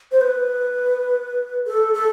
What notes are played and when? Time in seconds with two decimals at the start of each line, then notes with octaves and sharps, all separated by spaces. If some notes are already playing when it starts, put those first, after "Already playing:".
0.12 C5
0.21 B4
1.67 A4
1.94 A4